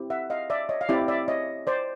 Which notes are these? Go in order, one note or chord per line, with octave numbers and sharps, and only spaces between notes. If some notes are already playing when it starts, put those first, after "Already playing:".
Already playing: C4 E4 G4
E5 F#5
D#5 F5
D5 E5
C#5 D#5
F5
C4 E4 G4 D5 E5
D5 E5
C#5 D#5
C5 D5